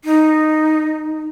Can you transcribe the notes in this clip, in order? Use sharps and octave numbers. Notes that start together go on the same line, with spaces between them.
D#4